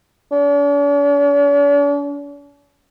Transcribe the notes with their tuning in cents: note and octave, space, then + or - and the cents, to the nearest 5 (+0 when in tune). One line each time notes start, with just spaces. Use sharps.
D4 -45